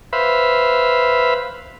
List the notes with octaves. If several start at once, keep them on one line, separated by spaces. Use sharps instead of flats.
B4 C5 E5 F5 B5